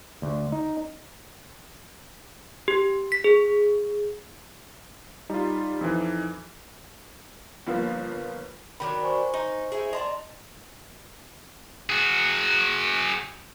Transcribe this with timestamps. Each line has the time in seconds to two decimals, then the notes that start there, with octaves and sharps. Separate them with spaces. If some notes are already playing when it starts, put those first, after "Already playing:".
0.22 D2
0.52 D#4
2.68 G4
3.12 B6
3.24 G#4
5.30 G3 D#4 F4
5.81 F2 E3
7.67 G1 F3 A#3 B3 F4 F5
8.80 D#3 F#3 D4 B5
9.03 C5 G#5 C#6
9.34 D#4
9.72 D#4 E4 G#4
9.93 D5 D#5 A5 A#5 C6
11.90 F#4 G#4